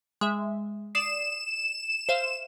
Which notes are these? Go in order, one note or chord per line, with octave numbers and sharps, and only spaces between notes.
G#3 E5
D5 D#6 C7 E7
C5 E5 F5